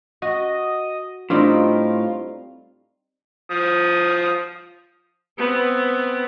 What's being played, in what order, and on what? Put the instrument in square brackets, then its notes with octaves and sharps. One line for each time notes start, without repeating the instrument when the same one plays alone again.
[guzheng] F#4 [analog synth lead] D#5
[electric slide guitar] A2 [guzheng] G3 C4 D#4 [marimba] D4 [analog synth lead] F4
[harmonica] F3 D#6
[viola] B3 C4